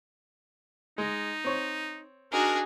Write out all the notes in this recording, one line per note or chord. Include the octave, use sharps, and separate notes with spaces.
G#3 D#4
C4 C#5
D4 D#4 F#4 G#4 A#4